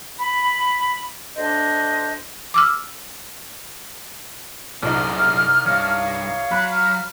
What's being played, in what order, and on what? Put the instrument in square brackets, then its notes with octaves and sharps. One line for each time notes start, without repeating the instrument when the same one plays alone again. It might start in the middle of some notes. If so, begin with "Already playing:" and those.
[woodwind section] B5
D2 D4 C5 D#5
[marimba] D6 E6 F6
[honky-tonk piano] C2 D#4 [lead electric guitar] F#2 G#3 [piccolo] F6
[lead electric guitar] E2 G2 [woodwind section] C#5 F5
[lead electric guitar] F#3 [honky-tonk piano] B5 [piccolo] F#6
[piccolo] F6